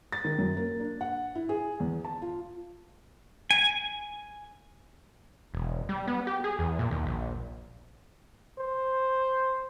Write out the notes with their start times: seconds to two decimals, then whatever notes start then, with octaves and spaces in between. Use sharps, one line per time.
0.12 A6
0.24 D#3
0.38 F#2
0.57 A#3
0.79 D4
1.01 F#5
1.35 E4
1.49 G#4
1.80 E2
2.05 A5
2.22 F4
3.51 G#5
5.54 E1
5.89 G3
6.07 B3
6.27 G4
6.44 G#4
6.59 E2
6.79 A#2
6.91 D#2
7.07 A#1
8.59 C5